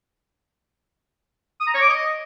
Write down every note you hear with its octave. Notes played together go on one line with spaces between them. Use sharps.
D#6
A#5
C#5
D6
D#5